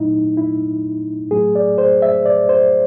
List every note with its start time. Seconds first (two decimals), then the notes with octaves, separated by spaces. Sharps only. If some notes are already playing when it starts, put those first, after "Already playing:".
Already playing: A#2 F#3 A3 D#4 E4
0.37 E4
1.31 A2 F#3 A3 G#4
1.55 D5
1.78 C5
2.02 E5
2.26 D5
2.49 C5